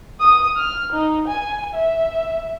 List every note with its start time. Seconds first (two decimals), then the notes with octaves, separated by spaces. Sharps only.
0.20 D#6
0.57 F6
0.93 D#4
1.28 G#5
1.74 E5